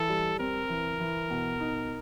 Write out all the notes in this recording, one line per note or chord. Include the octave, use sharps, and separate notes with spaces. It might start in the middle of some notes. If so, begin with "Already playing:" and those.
Already playing: E3 A4
G3
C4 A#4
E3
E3
B2
D#4